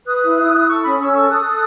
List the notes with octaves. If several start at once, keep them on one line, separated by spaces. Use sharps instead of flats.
B4 D#6 F#6
E4
E4
E4
A4 C#6 E6
C#4 B5 D#6
C#4 C#6 E6
A4 C#6 E6
A4 D#6 F#6
A4